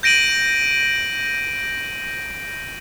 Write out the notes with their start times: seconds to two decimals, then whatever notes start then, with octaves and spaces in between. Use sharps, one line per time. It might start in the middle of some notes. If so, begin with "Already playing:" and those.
0.03 G6 A#6 D7 D#7 F#7